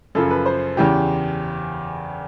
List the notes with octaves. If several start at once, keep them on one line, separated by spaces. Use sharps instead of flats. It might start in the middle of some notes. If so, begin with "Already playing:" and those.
F#2 C#3 F3 A4
B4
C5
E2 C#3 E3 G4